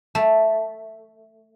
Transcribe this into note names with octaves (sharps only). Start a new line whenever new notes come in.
A3